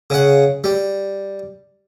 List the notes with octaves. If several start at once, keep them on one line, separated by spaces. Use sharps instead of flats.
C#3 F#5
G3